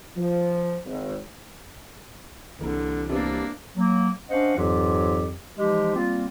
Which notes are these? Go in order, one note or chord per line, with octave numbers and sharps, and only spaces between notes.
F3
G#1
C2 D3 E3 A#3 A#4
C3 A#3 B3 D4
F#3 A#3
C#4 D4 C5 D#5 F5 F#5
F2 G#2 E3 F#3 F4 G4
E3 F3 G#3 D#4 G4
G3 A#3 C4 F4